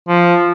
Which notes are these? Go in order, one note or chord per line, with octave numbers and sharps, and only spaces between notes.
F3